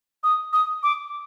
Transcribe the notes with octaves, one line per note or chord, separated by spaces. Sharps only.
D#6
D#6
D6